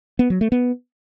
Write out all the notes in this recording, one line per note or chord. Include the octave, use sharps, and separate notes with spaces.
B3
F#3
A3
B3